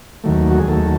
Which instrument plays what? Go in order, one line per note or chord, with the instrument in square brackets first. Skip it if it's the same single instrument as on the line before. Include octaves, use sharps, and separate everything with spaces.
[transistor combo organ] D#2 D#3 F#3 A3
F#4
G#4
D#2 D#3 F#3 A3 A4